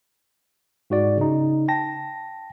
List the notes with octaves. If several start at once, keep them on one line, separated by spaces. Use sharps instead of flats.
G#2 F#4 D5
C#3 D#4
G5 A5 A#6